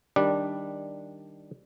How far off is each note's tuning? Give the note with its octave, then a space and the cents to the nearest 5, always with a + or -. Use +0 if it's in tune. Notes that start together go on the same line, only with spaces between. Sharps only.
D#3 +0 G3 +0 D4 +0